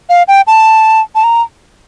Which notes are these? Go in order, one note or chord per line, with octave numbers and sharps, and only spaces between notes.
F5
G5
A5
A5
A#5